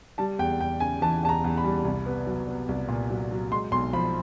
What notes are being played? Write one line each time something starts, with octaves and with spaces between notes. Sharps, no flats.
G3 A5
E2 G5
E2 G5
C#3 G#5
E3 A5
E2 A5
A#5
E2
B5
G3
C2
B3
F#3
B3
C2
A#2
F#3
F#3
G#3 C6
B1 C6
F3 B5